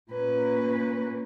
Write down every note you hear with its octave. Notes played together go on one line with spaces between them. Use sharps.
A#2 A#3 C#4 B4